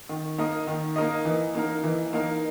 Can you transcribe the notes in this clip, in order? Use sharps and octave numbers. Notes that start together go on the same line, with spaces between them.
D#3
A#3 D#4 A#4 D#5
D#3
A#3 D#4 A#4 D#5
E3
A#3 D#4 A#4
E3
A#3 D#4 A#4